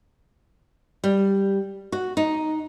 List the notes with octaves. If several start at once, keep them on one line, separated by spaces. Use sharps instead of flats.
G3
F#4
D#4